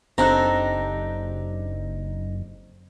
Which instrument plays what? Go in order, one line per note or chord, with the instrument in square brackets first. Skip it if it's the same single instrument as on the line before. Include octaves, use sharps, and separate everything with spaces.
[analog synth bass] F#1 [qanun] C4 A4 [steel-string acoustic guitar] D4 D#4 G4 [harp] A#5 F#6